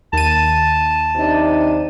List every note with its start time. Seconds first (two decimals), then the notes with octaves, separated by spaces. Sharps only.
0.13 D#2 A5 D#7
1.16 C3 D4 D#4